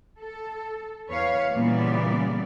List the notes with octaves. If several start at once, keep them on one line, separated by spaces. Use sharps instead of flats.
A4
E2 B4 C#5 F5
A#2 C#3 E3 G3 B3 D5